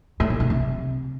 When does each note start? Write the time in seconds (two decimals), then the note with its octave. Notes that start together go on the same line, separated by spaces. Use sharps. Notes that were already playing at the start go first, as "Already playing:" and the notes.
0.20 A2
0.30 A#2
0.40 C3
0.50 C3